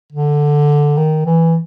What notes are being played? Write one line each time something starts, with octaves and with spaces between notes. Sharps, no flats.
D3
D#3
E3